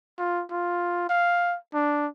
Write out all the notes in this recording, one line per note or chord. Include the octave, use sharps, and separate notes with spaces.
F4
F4
F5
D4